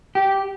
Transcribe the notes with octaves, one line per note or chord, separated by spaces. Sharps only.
G4